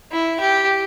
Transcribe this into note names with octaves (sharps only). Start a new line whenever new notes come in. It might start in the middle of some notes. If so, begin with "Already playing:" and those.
E4
G4